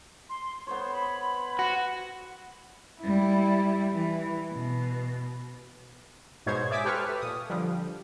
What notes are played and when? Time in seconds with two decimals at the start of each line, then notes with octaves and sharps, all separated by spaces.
0.29 C6
0.67 B3 C5 C#5 C6
0.92 B5
1.59 F#4
3.01 G3 E4
3.93 E3
4.53 B2
6.46 G#2 B2 C5 C#5 G#6
6.71 D5 E5 G#5 D6 D#6 B6
6.85 G4 A4 B4 C5 C#6 F6
7.21 A#2 D#6
7.49 D3 F3 G3